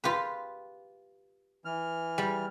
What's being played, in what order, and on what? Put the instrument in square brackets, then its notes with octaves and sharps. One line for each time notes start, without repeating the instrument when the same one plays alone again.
[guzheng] F4 G4 B4
[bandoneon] E3 F6
[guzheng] G3